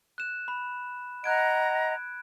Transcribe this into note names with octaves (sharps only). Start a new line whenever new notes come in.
F#6 E7
B5
D#5 F#5 A#5 F#6 G#6 D7